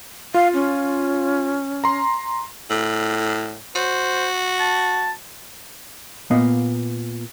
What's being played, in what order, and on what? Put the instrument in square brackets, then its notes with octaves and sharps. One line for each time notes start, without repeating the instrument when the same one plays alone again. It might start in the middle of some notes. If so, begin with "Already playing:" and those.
[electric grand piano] F4 [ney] F5
[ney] C#4
[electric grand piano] A#5 C6
[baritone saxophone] A2
[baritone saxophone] F#4 [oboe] C5
[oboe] A5
[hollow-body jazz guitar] A#2 B3 D#5 F5